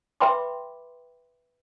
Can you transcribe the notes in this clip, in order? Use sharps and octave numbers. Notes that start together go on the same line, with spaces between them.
B4 E5 G5 B5 C6 D6